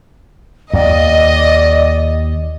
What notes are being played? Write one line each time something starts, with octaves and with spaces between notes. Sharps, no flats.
D#2 D5 D#5